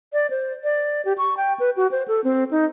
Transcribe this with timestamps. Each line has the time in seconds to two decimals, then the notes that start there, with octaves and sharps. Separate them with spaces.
0.13 D5
0.30 C5
0.64 D5
1.05 G4
1.18 C#6
1.37 G5
1.59 B4
1.77 F#4
1.91 C5
2.08 A4
2.24 C4
2.51 D#4